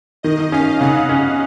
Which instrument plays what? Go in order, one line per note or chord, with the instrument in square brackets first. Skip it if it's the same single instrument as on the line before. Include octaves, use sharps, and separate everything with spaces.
[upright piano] D#3 [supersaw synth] D#5
[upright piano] C#4 [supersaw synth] F5
[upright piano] C#3 [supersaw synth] F#5
[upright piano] C#4